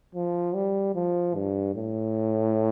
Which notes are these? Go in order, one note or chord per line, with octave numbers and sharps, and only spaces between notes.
F3
G3
F3
G2
A2